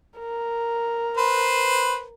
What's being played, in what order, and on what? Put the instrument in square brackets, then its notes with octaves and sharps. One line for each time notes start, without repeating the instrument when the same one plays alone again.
[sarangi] A#4
[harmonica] B4 C5